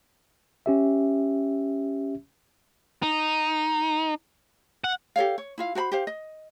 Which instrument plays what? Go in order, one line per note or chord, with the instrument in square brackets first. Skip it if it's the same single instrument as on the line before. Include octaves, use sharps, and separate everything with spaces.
[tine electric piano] C#4 G4 E5
[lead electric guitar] D#4
F#5
[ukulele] G4 A4 C#5 F5
C#5
E4 F4 F5
F#4 C5 G#5 B5
G4 C5 F5
D#5